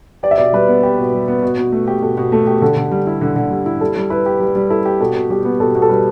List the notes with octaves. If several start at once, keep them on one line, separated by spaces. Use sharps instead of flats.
G4 D5
E5
B2 D5
G3 B4
B3
G4
B2
G3
B3
B2
B2
A3
G4
B2 A4
B2
A3 A4
G4
D3 A4
D3
G3
E4
D3
D3
G3
E4
G3 A4
G3
E4 B4
G4
G3 B4
G3
E4 A4
G4
B2 A4
B2
G3 G4
B3
B2 A4
B2
A4
G3 B4